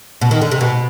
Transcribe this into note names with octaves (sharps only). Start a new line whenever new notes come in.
B2
D#3
D3
C3
B2